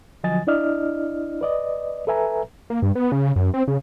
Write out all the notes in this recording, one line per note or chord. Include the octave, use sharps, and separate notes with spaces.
D3 F3 F#3 D#5 G#5 A6
D4 E4 D5 D#5 F6
B4 D5 D#5
A4 B4 E5 G#5 A#5
A#3
G2
B3
C#3
F#2
C4
C#3